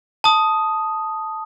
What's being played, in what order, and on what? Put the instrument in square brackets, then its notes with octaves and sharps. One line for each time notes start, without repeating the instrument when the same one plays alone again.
[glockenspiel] A5 D#6